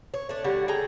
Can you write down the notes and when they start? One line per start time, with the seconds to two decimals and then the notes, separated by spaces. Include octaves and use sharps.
0.14 C#5
0.29 A3 D4
0.44 D3 G3 F#4 C#5
0.68 G#4 A4 G5 A#5